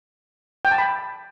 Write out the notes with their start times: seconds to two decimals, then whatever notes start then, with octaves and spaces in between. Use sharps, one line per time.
0.65 G5
0.71 A5
0.78 B5